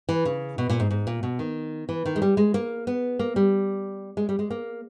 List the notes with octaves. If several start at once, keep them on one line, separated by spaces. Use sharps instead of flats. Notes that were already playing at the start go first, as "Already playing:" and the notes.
E3
C#3
B2
A#2
G#2
G#2
A#2
B2
D#3
E3
D#3
G#3
G3
G#3
A#3
B3
A#3
G3
G#3
G3
G#3
A#3